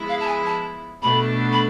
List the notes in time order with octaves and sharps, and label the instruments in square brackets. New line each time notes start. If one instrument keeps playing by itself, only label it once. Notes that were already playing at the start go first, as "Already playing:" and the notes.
Already playing: [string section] F3 G#3 B3 E4
[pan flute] F5
A5
G#5
A5
[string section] B2 A3 D4 [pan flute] B5
[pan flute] B5